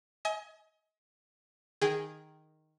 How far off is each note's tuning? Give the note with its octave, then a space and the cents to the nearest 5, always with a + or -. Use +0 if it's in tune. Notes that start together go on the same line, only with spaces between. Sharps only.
D#5 +35 G#5 +20
D#3 +0 G#4 -10 G5 -20